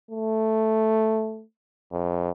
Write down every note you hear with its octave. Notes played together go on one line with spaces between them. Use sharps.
A3
F2